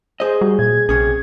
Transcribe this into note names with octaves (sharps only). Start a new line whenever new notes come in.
G#4 C5 D#5
G3 F#4
A#2 G#6
A#1 C3 C#4 G#4